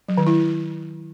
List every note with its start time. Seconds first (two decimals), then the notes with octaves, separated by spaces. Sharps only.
0.09 F#3
0.18 D#3
0.27 E4